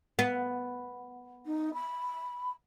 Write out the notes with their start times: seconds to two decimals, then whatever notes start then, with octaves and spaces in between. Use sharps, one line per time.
0.19 B3
1.46 D#4
1.73 B5